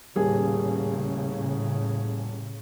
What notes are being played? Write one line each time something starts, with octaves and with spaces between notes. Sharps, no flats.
D#1 A2 C#3 G#4